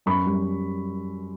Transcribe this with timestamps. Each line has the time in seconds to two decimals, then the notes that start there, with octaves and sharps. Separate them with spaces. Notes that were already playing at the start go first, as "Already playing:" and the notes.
0.06 F#2 B5 C#6
0.26 G3